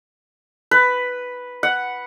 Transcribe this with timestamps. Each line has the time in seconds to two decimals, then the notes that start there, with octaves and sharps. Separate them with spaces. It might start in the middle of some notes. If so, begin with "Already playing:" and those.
0.71 B4
1.63 F#5